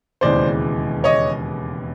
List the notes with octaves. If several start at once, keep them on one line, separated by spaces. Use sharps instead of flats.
E1 D#2 C#3 E3 G#3 C5 D5
C#5 D#5